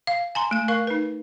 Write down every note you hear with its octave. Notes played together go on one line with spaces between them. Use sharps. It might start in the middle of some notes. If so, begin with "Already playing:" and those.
F5
G#5 A#5 C6
A3 G#5
A#4 F5 C#6
D#4 B4